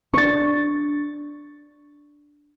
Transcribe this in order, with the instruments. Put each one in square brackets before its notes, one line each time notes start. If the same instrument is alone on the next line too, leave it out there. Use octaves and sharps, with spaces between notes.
[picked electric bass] C4 D4 [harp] C#6 A6